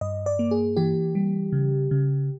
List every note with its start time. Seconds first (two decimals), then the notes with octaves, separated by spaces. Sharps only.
0.01 G2 D#5
0.26 D5
0.39 A#3
0.51 G#4
0.76 E3 G4
1.15 G3
1.53 C#3
1.91 C#3